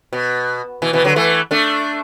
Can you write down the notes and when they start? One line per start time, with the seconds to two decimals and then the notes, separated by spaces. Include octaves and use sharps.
0.13 B2
0.82 B2 E3
0.93 B2 E3
1.04 D3 F#3
1.16 E3 A3
1.51 A3 D4